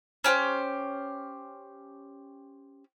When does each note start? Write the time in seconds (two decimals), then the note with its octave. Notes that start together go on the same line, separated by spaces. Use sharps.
0.24 C#4 G4 B4 C5